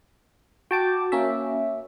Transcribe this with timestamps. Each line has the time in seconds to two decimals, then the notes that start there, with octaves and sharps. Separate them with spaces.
0.71 F#4 G5 A5 D6
1.12 A#3 C#4 E5